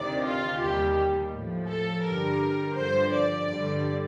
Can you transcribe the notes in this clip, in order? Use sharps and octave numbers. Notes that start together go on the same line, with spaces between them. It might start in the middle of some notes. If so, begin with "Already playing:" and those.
Already playing: D2 C3 D#3 D5
F4
D#2 D#3 G3 G4
A2 F3
A4
G2 D3 G3 A#4
G2 D3 F3 C5
D5
G2 D3 G3